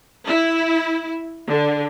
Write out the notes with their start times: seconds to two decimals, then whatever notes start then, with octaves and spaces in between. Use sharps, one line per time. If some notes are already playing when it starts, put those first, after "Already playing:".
0.25 E4
1.49 D3